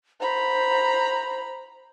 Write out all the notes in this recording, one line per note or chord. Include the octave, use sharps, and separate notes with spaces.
C5 A#5 B5